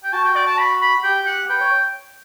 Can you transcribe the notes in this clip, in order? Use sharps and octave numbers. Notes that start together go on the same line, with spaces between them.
G5
F#4 A5
G5
D5
A5
B5
B5
G4 G5
F#5
B4 G5
C#5